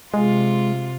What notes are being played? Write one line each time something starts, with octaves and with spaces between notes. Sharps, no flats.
C3 G#3 F4